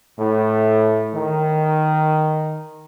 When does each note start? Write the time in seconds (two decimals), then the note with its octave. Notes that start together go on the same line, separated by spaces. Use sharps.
0.19 A2
1.15 D#3